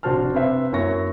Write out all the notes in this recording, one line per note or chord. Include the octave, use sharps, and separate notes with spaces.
F1 D4 F#4 C5 A5 F6
C3 B4 C5 E5
F#2 A#3 E4 C#5 C#6 A#6